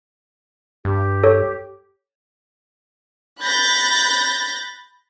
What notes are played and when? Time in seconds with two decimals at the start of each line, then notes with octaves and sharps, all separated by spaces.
0.85 G2 G4
1.23 A4 C#5
3.41 B5 F#6 G6 A6 A#6